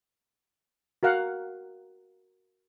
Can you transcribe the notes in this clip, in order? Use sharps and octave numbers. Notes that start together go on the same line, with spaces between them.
F#4 A#4 F5 F#5